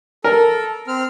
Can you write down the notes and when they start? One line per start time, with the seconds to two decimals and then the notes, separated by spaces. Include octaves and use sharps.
0.24 A4 A#4
0.88 C4 F6